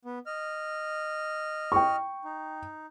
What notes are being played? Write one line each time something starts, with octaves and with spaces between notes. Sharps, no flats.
B3
D#5 F6
G5 C#6
D#4